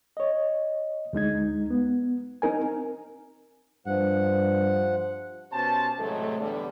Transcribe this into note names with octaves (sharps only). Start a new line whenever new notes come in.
C#5 D#5
D2 G#3 D#4 G#6
B3
C4 D#4 A#4 G#5
G2 F3 F#5
B2 C#4 G4 C5 A5
A2 C3 E3 F#3 G#3 A3
E2 A2 D3 G3